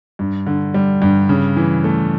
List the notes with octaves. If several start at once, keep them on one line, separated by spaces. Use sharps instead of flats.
G2
D3
G3
G2
C#3
E3
A3